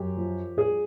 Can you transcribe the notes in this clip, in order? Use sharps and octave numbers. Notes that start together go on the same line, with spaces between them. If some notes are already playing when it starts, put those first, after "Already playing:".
Already playing: F#2 G4
F3
G2 G#4